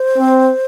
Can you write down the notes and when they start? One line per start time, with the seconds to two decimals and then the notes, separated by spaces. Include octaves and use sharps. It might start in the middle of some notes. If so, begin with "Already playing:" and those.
Already playing: C5
0.18 C4